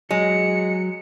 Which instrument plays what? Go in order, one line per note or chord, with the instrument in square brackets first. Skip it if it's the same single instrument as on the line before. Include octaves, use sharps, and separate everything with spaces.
[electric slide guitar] F#3 [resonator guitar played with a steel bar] G#3 [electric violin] C#7